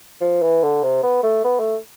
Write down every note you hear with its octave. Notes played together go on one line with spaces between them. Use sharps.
F3
E3
D3
C3
B3
A3
B3
A3